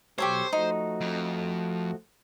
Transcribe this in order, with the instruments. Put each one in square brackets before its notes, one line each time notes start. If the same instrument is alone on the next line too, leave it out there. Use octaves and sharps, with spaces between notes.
[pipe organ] B2 F#3 [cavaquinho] G4 A4 C#5 [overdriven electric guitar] C5
[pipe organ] F3 A3 F#4 [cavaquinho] D#4
[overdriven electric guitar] F2